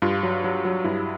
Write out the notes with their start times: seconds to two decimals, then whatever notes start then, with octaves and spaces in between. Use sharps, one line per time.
0.02 G2 F4
0.23 F#3
0.44 F#3
0.65 F#3
0.84 G2 E4